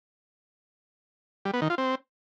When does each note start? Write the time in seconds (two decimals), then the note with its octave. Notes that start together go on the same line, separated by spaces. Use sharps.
1.45 G3
1.54 B3
1.62 D#3
1.70 F4
1.78 C4